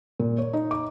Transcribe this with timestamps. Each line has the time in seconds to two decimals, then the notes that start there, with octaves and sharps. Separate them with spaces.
0.20 A#2
0.38 C#5
0.53 D#4
0.71 D6